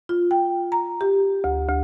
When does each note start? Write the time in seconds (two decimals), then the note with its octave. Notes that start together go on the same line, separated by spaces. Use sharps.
0.09 F4
0.31 G5
0.72 A#5
1.01 G4
1.44 D2
1.69 D2